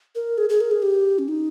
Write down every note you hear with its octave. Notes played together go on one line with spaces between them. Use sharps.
A#4
G#4
G#4
A#4
G#4
G4
C#4
D#4